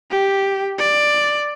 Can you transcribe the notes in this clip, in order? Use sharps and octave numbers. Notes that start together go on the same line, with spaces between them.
G4
D5